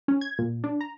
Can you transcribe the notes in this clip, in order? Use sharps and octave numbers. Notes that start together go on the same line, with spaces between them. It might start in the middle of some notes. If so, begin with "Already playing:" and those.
C#4
G#6
A#2
D4
A#5